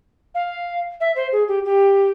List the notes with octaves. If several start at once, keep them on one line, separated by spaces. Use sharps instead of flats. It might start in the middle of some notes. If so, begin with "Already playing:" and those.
F5
E5
C5
G#4
G4
G4